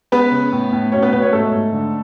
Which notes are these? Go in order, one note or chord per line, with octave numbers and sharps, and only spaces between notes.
G#3 B3 B4
C#3
A2
A2
B2 C#4 C#5
B3 B4
B2 B3 B4
C#4 C#5
G#2 A3 A4
G#2
D3